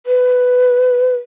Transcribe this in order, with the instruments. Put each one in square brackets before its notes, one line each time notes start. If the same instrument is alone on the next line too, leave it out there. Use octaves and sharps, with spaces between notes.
[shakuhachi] B4